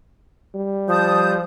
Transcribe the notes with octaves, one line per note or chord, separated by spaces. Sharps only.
G3
F3 A5 D#6 G6